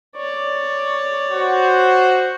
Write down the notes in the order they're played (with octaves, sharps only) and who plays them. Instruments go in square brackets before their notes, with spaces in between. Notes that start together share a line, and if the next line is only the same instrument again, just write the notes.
[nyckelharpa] C#5 D5
[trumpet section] F#4 C5